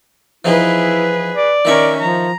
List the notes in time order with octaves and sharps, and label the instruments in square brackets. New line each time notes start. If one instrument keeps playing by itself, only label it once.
[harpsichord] E3 F3 D#4 [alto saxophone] E4 [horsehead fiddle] G#4 B4
[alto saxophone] D5
[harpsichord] D#3 E5 C#6 [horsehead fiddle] C#4 A#4
[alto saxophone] F3 [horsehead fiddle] A#5